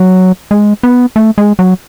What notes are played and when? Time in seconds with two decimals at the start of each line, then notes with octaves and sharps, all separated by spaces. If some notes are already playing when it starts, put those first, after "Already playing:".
Already playing: F#3
0.51 G#3
0.83 B3
1.16 A3
1.38 G#3
1.59 F#3